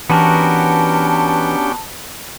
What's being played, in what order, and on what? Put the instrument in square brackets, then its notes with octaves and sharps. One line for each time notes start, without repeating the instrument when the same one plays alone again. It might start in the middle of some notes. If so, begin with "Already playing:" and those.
[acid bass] E3 [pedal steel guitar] B3 F#4 A#4 [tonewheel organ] C#4 D4 G4 [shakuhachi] A5